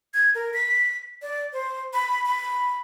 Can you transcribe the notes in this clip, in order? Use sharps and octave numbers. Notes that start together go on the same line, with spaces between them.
G#6
A#4
B6
D5
C5
B5
B5